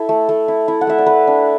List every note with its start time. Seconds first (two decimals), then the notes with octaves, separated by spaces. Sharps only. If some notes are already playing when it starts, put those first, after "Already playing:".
Already playing: E4 A4
0.09 A3
0.29 A3
0.48 E4
0.68 E4
0.81 F#5
0.87 A3 E5
0.98 D5
1.06 A3 B4
1.27 D4